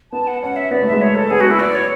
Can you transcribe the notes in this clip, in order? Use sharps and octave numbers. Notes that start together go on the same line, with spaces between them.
B3 A5
F#5
C#4 F#5
E5
B3 D5
A3
E5
G#3
C#5
A4
B3 G#4
F#4
B3
E4
D5
C#5